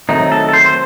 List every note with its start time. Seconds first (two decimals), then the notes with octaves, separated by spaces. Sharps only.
0.09 D#3 F#3 A3 C4 D#4
0.32 A4
0.49 A4
0.53 C5
0.66 C5